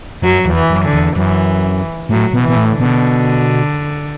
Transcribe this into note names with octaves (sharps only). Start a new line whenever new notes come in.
F#2 F#3
E2
E3
F#2
D3
E2
F#2 E3
A2 F#3
B2
E3
B2
A2
D3
B2